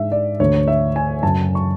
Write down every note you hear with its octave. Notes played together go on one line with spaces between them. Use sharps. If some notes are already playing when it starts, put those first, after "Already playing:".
Already playing: G#2 G#3 D4 E5
D5
D2 D3 A3 C#5
E5
G#5
F#2 C#3 F#3 A5
C#6